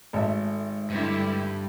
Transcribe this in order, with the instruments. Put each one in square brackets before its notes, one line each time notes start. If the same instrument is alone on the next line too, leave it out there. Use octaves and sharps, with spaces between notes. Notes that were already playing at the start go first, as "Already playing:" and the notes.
[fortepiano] G#1 [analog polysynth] G#3 A3 E5
[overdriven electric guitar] G2 [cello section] D3 E4 G4